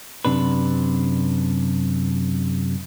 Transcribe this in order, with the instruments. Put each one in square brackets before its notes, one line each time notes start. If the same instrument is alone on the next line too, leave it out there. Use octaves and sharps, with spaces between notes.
[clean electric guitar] F#2 C3 D4 B4